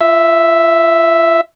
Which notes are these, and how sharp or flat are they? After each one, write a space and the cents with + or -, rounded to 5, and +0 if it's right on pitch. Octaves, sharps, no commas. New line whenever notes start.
F4 -35 E5 +0